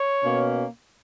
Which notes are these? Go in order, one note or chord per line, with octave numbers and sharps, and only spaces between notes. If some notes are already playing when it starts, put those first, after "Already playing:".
Already playing: C#5
B2 A#3 C#4